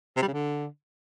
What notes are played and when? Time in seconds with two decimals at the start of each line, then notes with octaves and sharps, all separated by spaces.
0.17 C3
0.22 G3
0.28 C#3
0.33 D3